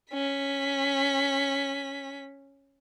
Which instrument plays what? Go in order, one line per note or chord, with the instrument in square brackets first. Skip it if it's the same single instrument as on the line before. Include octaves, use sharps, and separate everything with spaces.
[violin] C#4 B6